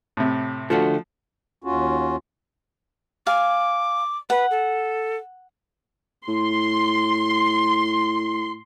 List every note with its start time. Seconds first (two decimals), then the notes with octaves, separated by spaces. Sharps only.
0.17 A2 C3
0.70 D3 F3 A3 F#4
1.64 D#2 C#4 F4 F#4
3.27 F5 G#5 D6
4.30 B4 F#5
4.51 A4
6.28 A2 C6